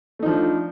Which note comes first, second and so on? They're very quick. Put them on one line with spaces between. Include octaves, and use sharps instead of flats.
A3 D#4 F3 D4